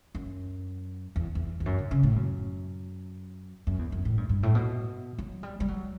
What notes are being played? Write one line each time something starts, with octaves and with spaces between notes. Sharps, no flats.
F#2
E2
E2
E2
F#2
D3
C#3
A2
F#2
F#2
E2
F#2
A2
G2
G2
A2
B2
F#3
G3
G3
F#3